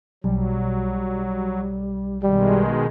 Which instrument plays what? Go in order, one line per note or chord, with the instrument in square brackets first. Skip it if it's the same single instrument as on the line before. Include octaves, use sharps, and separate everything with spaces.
[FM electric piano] B1 [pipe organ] F#3 [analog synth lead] G3
[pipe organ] B2 D#3 G#3 [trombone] G3